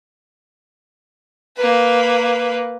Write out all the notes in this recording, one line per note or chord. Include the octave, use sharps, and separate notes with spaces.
A#3 B4